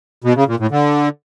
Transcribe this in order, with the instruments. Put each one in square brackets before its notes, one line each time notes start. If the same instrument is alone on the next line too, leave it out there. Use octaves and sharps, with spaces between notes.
[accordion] B2
C#3
A#2
A2
D3